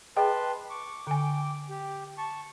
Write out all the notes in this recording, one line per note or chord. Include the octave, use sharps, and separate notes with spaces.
G#4 B4 D#5 G5 A5 C6
C#6 D6
D3 G5 G#5 D6
G4
A5 C#6